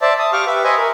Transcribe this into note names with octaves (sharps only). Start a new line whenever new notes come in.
C5 D5 E5 A5
A5 D#6
G4 F5 G5 C#6 D6 F6
G4 B4 E5
C5 D#5 E5 G#5 B5 C#6
A#4